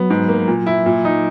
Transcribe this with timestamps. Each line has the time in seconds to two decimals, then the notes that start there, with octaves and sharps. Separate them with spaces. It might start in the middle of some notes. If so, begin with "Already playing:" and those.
Already playing: F#3 B3
0.10 G#2
0.29 A#3
0.48 A#2
0.66 E4
0.86 A#2
1.05 D#4